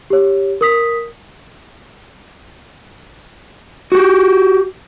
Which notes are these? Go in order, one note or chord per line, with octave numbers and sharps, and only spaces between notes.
G4 C#5
A#4 D#6 B6
F#4 G4